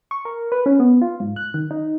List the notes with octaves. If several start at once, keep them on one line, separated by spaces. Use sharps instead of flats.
C#6
A#4
B4
C#4
B3
F4
G#2
F#6
D#3
D#4